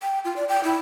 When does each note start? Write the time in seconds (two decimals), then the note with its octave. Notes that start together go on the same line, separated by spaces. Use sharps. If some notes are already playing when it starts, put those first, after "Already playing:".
0.03 G5
0.25 F4
0.36 D5
0.49 G5
0.63 E4